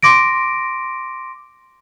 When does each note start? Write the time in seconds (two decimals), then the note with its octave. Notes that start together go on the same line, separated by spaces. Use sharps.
0.03 C6 D6 A#6 D7